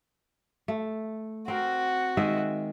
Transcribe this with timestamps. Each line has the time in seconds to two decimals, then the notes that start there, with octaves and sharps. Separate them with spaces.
0.68 A3
1.48 C4 F#4 A#4
2.17 D#3 G#3 E5